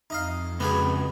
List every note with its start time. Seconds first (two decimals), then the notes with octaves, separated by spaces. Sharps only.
0.10 F2 D#4 D#5 F5
0.60 C#2 B3 F#4 G#4